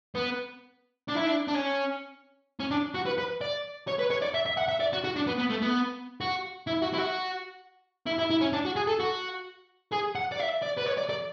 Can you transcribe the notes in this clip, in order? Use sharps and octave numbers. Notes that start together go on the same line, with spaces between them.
B3
D4
E4
D4
D4
C#4
C#4
D4
F#4
B4
B4
D5
C#5
B4
C#5
D5
E5
E5
F#5
E5
D5
F#4
F#4
D4
B3
B3
A3
B3
F#4
E4
F#4
E4
F#4
E4
E4
E4
C#4
D4
F#4
G#4
A4
F#4
G#4
F#5
D5
E5
D5
B4
C#5
D5
D5